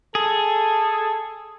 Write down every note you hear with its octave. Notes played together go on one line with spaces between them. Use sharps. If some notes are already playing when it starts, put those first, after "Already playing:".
G#4 A4